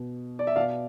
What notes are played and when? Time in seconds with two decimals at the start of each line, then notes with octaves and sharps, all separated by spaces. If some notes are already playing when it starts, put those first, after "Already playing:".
Already playing: B2
0.39 D5
0.47 E5
0.56 B2 D5 F5